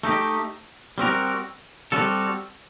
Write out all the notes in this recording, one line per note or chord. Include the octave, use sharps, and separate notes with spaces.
A3 D#4 G4
G3 C4 F#4 A#4
G3 C4 F#4 A4